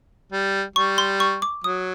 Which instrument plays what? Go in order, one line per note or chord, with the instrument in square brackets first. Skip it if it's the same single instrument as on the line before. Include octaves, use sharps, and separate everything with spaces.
[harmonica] G3
[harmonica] G3 [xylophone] C#6
[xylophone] C6
C#6
D6
[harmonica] F#3 [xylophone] D#6